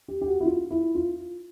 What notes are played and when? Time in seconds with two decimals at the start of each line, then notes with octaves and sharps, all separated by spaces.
0.08 G4
0.21 G4
0.27 F#4
0.41 E4
0.46 F4
0.71 E4
0.95 F4